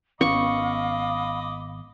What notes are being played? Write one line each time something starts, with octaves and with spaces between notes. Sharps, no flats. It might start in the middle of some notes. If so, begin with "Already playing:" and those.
G#1 B3 C#4 D#5 F5 B5 C#6 D6